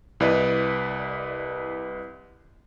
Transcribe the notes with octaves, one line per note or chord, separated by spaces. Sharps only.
C2 E4 B4 D5 D#5